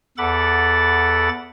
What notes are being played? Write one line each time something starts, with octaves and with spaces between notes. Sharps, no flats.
E2 A4 F#5 B5 D6 A6